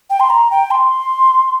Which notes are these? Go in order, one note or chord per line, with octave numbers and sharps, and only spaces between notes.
G5
C6
A#5
G5
C6